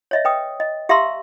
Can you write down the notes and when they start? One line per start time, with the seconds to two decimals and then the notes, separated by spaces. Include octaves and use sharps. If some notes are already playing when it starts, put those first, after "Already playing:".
0.11 C#5 D#5 E5
0.25 B4 G5 D#6
0.60 D#5
0.89 G4 E5 F5 A#5 C6 E6